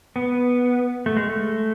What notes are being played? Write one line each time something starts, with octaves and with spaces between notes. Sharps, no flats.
B3
A3
G#3
A3